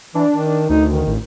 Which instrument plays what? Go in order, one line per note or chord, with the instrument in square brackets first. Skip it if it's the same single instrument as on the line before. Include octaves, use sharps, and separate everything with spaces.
[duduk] E3 [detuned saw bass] D4
[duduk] D#3
[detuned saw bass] D2 [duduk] D#4
[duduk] D#3
[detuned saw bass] A1